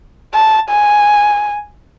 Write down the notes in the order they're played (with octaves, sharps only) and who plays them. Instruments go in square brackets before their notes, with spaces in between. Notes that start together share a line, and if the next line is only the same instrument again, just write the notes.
[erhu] A5
G#5